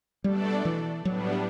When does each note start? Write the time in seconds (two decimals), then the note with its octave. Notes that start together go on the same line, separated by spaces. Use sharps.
0.24 B2 G3 A3 D4 A4 D5
0.65 E3
1.05 A2 F#3 G3 B3 D4